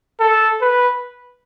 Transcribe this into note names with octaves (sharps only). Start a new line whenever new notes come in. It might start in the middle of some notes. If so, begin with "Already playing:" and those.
A4
B4